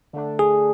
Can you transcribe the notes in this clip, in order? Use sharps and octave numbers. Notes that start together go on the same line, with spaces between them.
D3 A3 D4
G#4